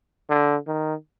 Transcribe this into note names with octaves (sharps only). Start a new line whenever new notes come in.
D3
D#3